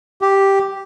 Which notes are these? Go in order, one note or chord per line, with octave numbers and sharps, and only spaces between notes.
G4